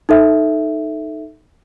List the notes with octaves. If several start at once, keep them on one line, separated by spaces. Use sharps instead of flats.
D#4 A4 E5